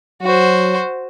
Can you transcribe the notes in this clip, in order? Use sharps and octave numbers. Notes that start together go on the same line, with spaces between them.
F#3 F#4 C5